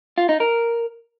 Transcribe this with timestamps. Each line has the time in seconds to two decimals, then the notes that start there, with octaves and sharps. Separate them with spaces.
0.18 F4
0.29 D#4
0.40 A#4